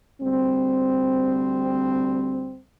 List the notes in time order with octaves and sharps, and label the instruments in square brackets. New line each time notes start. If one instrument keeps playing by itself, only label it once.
[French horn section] D2 G3 C4